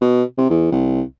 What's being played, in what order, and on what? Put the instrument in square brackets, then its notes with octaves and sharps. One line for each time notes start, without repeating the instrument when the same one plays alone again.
[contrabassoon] B2
C3
E2
C2